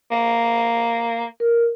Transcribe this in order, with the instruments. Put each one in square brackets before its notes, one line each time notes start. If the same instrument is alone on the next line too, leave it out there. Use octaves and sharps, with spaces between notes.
[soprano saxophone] A#3
[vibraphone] A#4